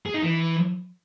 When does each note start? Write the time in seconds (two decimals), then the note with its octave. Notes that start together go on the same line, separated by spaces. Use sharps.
0.06 G#4
0.14 D#4
0.22 E3